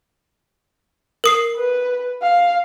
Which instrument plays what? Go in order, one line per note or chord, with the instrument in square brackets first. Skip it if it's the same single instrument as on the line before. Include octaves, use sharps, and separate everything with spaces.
[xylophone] A#4 D#6 C7
[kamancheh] B4
F5